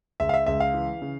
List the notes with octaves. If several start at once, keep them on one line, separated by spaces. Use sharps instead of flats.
C#2 E5
F5
E5
C#2 E5
F5
E3
C#3